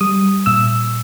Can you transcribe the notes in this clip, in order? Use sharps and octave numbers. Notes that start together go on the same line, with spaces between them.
G3 D#6
A#2 E6